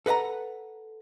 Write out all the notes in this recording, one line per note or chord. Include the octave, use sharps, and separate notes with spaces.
A4 B4 D#5 F#5 A#5